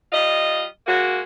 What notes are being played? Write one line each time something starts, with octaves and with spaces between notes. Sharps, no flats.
G3 F4 D#5
G#3 A#3 F#4